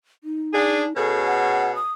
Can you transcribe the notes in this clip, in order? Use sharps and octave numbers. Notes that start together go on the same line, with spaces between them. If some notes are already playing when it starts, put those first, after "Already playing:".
D#4
D4 G#4
B2 C#4 G#4 A4
F#5
D#6